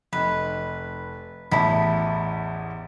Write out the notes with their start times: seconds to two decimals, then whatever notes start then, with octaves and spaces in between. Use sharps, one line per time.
0.13 F1 B4
1.51 A1 E2 E4 A5 B5